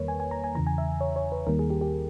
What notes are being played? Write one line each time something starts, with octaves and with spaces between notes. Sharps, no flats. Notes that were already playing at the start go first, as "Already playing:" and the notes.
Already playing: E2 D#3 G3 A#3 A#4 B4 C#5
G#5
G#5
A#5
G#5
E2 C#3 E3 A#5
G#5
E5
C#5
C#5
B4
D#2 D#3 G3 A#3 A#4
G#4
G4
G4